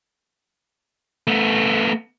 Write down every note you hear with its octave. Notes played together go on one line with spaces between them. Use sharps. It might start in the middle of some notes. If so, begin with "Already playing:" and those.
A3 B3